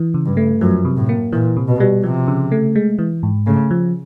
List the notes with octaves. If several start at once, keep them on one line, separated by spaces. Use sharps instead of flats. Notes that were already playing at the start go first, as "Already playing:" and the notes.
Already playing: E3
C#3
G2
A3
F#2 F3
C3
A2
A#3
A#2 E3
C3
B2
G3
C3 F3
C#3
A3
G#3
E3
G#2
C#3 A3
F3